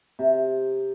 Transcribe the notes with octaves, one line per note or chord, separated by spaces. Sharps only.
C3